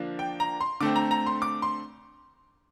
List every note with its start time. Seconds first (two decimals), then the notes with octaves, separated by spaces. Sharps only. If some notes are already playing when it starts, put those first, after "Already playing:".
Already playing: D3 F3 A#3 D4
0.19 G5
0.40 A#5
0.61 C6
0.81 D3 A3 C4 D6
0.96 A#5
1.11 A#5
1.26 C6
1.42 D6
1.62 C6